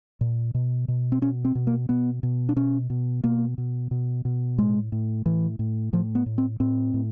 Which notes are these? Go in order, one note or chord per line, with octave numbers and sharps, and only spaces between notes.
A#2
B2
B2
C4
B2 C#4
C4
B2
A#3
B2 B3
B2
D4
B2 C#4
B2
B2 A#3
B2
B2
B2
A2 G#3
A2
A2 E3
A2
A2 F3
B3
A2
C4
A2 C4
A2